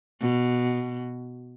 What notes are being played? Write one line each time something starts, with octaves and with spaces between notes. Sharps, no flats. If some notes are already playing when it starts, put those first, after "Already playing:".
B2